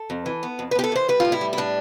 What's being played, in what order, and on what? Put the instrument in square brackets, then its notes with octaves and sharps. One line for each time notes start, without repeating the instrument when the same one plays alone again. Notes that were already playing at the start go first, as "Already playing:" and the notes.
Already playing: [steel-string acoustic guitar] A4
F2
E3
B3
F2
B4
B3 G4
A4
E3 C5
G3 B4
A2 F4
E4
G3
E4
A2 D4